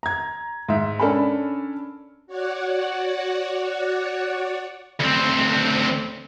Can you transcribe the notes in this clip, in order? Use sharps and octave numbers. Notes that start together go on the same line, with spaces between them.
A#5 G#6
G#2 E5
C#4 D4 A4 A#4 G#5 B5
F#4 C#5 D5 F#5
D2 C4